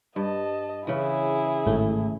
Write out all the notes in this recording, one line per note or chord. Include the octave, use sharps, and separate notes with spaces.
G2 D#5 A5
C#3 E3 E4 G#4
G#1 A2 A3